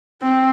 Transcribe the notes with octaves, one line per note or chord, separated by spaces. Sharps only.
C4